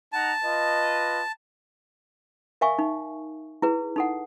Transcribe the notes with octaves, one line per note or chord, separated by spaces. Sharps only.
D#4 F#5 A5 A#5
F4 B4 D#5
A#4 E5 F5 G#5 C#6
D#4
E4 G#4 B4
D#4 A4 F#5